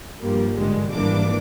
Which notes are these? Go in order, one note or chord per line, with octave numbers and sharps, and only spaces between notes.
G2 F3 G3 A#3
A1 G#2 D3 G3 G#3
G#1 E3 G3 A#3 D4 D6